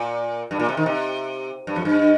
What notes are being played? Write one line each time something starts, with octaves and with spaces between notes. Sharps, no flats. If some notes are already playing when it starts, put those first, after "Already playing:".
Already playing: A#2
G2
A#2
C3
D#3
C3
G2
F2
G2